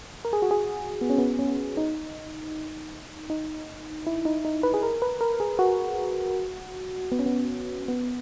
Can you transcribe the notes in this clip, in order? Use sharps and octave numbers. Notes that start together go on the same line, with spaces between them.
A#4
G#4
F#4
G#4
B3
C#4
B3
C#4
D#4
D#4
E4
D#4
D#4
B4
G#4
A#4
B4
A#4
G#4
F#4
B3
C#4
B3
B3